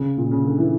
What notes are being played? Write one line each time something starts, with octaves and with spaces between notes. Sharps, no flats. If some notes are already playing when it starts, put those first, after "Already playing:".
Already playing: C#3
A#2
C#3
D3
E3